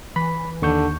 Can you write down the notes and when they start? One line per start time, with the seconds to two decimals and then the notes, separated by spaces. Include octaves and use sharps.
0.16 E3 B5
0.62 D#2 D3 C#6 G6